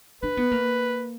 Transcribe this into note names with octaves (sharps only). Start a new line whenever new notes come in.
D4 B4
B3
A#3